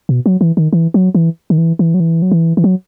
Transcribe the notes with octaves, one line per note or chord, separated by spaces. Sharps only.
B2
F#3
E3
D#3
E3
F#3
E3
D#3
E3
E3
F#3
E3
F#3
E3
E3
F#3